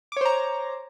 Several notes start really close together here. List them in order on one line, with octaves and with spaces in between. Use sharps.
D6 C#5 C5 A#5